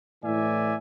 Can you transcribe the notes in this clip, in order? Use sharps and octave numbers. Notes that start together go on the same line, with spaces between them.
A2 E3 D5 E5 G#5